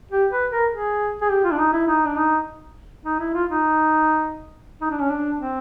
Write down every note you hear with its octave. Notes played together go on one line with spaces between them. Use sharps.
G4
B4
A#4
G#4
G#4
G4
F4
D4
D#4
E4
D#4
D4
D#4
D#4
E4
F4
D#4
D#4
D4
C#4
D4
C4